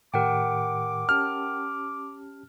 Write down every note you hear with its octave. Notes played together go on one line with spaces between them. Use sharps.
A2 D#3 G4 A#4 F#5 G5 D6
C#4 G4 A5 F6